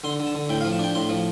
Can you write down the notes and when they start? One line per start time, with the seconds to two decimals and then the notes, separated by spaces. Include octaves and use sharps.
0.04 D3 C6
0.20 D3
0.27 A5
0.35 D3
0.49 A2 G5
0.61 F5
0.65 F3
0.73 A5
0.79 D4 G5
0.95 A2 C6
1.09 F3